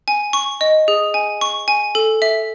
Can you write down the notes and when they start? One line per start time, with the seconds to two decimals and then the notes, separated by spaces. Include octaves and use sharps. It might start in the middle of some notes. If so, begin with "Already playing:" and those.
0.08 G#5
0.33 C#6
0.61 D#5
0.88 G#4
1.14 G#5
1.41 C#6
1.68 G#5
1.95 A4
2.22 E5